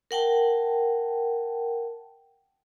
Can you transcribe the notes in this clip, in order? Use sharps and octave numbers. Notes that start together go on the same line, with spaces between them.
A#4 F#5 G5 A5